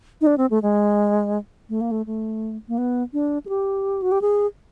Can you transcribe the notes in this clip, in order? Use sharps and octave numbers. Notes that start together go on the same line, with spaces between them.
D#4
D4
C4
A3
G#3
A3
A#3
A3
A3
A#3
B3
D4
G#4
G4
F#4
G4
G#4